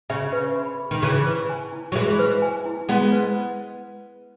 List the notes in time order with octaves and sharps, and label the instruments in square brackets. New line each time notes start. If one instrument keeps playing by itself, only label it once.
[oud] C#3 [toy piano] E5
[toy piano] B4
B5
G#4
[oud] D#3
[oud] C#3 E3 [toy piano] E5
[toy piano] B4
G#5
E4
[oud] F#3
[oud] E3 G#3 [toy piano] E5
[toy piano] B4
G#5
E4
[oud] G#3 B3 [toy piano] F#5
[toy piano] B4